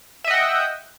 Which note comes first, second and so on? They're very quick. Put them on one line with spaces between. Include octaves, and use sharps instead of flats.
E5 D#5 F#5 G5